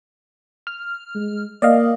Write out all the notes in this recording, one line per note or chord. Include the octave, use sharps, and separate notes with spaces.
F6
G#3
A#3 D5 D#5 F5